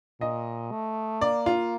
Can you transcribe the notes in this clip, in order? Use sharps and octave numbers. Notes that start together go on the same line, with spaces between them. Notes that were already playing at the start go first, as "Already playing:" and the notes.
A#2 D#5
A3
A#3 D5
F4